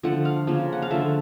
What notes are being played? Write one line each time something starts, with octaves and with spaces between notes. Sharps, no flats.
D3 F3 A3 F#5
F5
C#3 F3 A#3
F#5
F5
D3 F3 A3 E5